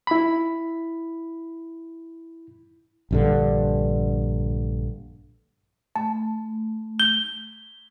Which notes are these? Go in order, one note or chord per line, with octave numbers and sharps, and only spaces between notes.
E4 B5
A#1 G2 D3
A3 A5
G6 G7